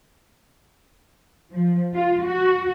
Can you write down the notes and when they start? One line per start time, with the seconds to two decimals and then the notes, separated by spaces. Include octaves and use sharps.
1.52 F3
1.95 F4
2.26 F#4